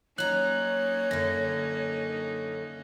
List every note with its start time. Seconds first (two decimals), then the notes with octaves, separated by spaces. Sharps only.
0.18 F#3 A#3 C#4 D#4 C#5 A#5 F#6 F#7
1.11 F#2 D3 A#6